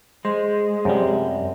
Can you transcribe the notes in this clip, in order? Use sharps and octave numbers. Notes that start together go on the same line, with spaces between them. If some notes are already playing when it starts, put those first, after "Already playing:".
G#3 C5
F#2 C3 F3 G3